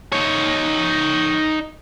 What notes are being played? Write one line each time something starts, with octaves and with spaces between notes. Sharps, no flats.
D#4 C#5